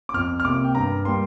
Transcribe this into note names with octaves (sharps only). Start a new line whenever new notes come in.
D6
F2 F6
F6
C3 A#3 D6
G5
G2 A#5
G3 A#3 C6